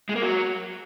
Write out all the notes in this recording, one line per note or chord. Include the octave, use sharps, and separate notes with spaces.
G#3
A#3
F#3